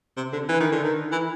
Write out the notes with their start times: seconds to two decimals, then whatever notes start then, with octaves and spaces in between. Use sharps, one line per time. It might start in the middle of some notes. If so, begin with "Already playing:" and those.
0.17 C3
0.33 D3
0.49 E3
0.60 D#3
0.72 D3
0.84 D#3
1.12 E3